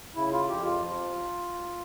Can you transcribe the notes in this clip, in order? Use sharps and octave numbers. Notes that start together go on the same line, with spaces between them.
C#3 E4
F4
F2 G4
F4
F3